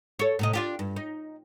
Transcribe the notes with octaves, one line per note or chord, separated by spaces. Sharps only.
A4 C#5
A2 C3 D#5
D4 F4 G4
G2
D#4